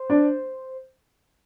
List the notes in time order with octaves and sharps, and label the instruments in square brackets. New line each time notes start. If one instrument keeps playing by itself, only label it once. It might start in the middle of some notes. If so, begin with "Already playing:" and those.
Already playing: [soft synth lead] C5
[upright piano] D4